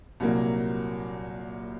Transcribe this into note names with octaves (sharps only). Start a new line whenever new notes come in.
C2 A#2 F#3 A#3